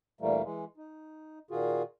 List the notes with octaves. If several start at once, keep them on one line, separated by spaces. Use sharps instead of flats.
D2 A#2 E3 G3 A3 A#3
E3 G#3
D#4
A#2 D#3 F4 F#4 G#4